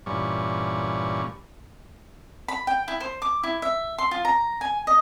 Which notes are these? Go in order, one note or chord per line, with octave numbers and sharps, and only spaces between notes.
G2 A#2 E3 G3 C#4 C#6
B5
G5
E4
C5
D6
E4
E5
C6
F4
A#5
G#5
D#5